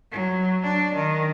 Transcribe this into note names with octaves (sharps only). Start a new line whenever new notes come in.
F#3
D4
D#3